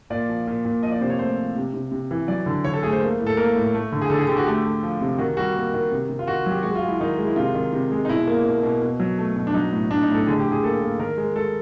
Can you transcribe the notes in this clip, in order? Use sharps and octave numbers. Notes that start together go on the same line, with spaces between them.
A#2 D5
F3
A#2
A#2
F3 D#5
D5
C3 C5
C#5
A3 C5
F3
C3
C3
C3
E3
F#3 D5
D3
D3 C#5
A4
A3 G#4
C5
A#3
A2
A4
A#3 A#4
A2
A3
D3
G#4
D3 A4
G#4
D3 G4
F#4
A3 G4
A3
F3
C3
D#3 F#4
G3 F#4
A#3
D#3
C3
C3
F4
D#3 F#4
F#3 G4
G#3 F#4
F4
G#3
E4
D#3 D#4
G#3
E4
C3 F4
D#3
C3
G#3
D#4
B2 E4
A#3
B2
B2
B2
F#3
A3
B2
D4
F#3 D#4
A2
A2 D4
D#4
A2 A4
D3 G#4
G4
D3
G#4
A#3 A4
A#3
D#3 A#4
G#3
G#3 A4